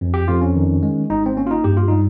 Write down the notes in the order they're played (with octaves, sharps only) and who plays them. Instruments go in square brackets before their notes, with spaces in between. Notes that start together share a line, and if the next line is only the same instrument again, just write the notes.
[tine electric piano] F2
G4
F2 F4
C#4
D#3
G#3
G#1 D#4
C4
A#3 C#4
F4
D#4
G2 G4
F4
G3 D#4